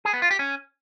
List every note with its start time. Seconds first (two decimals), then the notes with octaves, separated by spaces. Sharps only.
0.05 G#4
0.13 B3
0.22 F4
0.31 G4
0.39 C#4